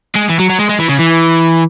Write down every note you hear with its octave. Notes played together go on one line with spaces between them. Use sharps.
G#3
E3
F#3
F#3
G#3
G#3
E3
C#3
E3